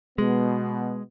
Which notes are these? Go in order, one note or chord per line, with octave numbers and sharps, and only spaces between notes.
B2 G#3 B3